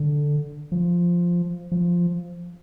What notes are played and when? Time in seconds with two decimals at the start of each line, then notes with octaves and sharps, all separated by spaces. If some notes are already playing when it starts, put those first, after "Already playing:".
Already playing: D3
0.72 F3
1.72 F3